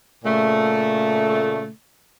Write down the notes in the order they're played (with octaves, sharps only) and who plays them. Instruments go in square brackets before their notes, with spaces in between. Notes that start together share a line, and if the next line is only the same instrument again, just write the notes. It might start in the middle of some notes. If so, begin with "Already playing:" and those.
[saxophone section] A#2 C#3 A3